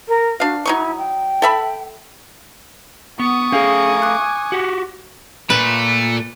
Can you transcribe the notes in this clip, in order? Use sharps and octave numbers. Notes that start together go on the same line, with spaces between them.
A#4
D4 F#4 F5
F#3 D#4 E4 C#6
G5
A4 E5 B5
B3 C#6 D#6
A3 C#4 G#4 F5 G#5
D6 F#6
F#4 G4
A#2 A3 B4